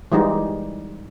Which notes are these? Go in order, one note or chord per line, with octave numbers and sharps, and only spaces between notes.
E3 G3 G#3 D#4